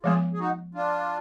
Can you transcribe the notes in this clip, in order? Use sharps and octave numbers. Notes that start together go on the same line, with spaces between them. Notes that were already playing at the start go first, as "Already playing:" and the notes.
F3 G#3 B3 F4 G#4
G#4
D#4 F#4
D4 F4